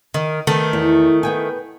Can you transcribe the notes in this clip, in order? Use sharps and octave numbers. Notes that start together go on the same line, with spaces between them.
D#3 D#5
D#3 A3 B3
E2
B3 G5 G#5